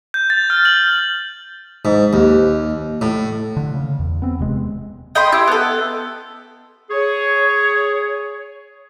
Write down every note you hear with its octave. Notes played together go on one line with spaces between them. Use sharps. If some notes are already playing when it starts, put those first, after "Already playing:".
G6
A6
F6
F#7
G#2
D#2
A2
D3
C#3
E2
B3 C4
D#1 C3 G#3
D#5 G5 B5 C6
E4 G4
B3 A4
G#4 C#5